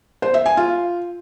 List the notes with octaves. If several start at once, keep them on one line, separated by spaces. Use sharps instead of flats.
C5
E5
G#5
F4